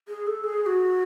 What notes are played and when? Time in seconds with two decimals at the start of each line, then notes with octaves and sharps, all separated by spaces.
0.08 G#4
0.27 A4
0.44 G#4
0.62 G#4
0.66 F#4